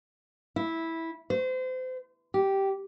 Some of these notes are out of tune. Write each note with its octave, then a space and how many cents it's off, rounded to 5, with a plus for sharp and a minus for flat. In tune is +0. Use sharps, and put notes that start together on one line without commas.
E4 -10
C5 -35
G4 -10